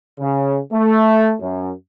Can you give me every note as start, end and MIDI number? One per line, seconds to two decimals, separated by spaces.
0.20 0.59 49
0.73 1.34 57
1.41 1.71 42